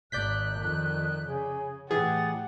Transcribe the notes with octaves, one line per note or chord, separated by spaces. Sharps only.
G#1 D#3 D5 F#6 G6 B6
F2 D#3
C#3 G#4
A2 E3 G4 G#4 F#5 A6